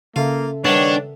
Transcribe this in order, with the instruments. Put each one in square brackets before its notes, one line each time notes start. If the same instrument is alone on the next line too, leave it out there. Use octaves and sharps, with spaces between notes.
[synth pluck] C#3 A4 E5 [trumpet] A#3 [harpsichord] F4
[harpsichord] D#3 G3 B3 [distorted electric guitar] D4 [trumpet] C#5